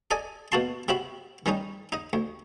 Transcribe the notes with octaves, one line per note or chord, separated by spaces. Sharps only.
A4 D5 D#5 G#5
B2 A#3 F#4 A5 C6
C3 C4 F#4 E5 B5
D#3 G3 C#4 D#4
D#4 D#5
D2